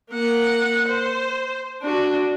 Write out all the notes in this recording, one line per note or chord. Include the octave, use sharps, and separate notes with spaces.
A#3 F#5
C5
D4 F#4